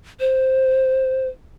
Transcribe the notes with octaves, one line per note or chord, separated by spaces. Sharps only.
C5